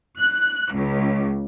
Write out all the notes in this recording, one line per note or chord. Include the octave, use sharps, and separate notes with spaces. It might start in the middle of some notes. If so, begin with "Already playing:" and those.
F#6
C#2